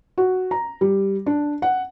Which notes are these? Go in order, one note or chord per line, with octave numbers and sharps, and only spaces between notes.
F#4
A#5
G3
D4
F#5